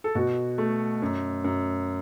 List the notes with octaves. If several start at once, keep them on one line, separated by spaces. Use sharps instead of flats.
A4
B2 F#4
A3
F#2
F#2